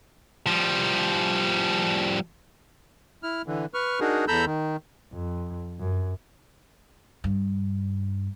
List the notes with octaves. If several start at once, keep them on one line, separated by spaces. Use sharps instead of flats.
F3 G3
E4 F6
D3 E3
B4 C#6 F6
D4 D#4 F#4 G#4 A#4
E2 A4 A#5 B5 E6 G6
D#3
F2
F#2
G2